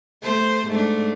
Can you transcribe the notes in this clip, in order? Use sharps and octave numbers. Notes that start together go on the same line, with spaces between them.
A3 C5
G#2 A3 D4